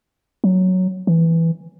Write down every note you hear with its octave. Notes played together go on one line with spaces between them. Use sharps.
F#3
E3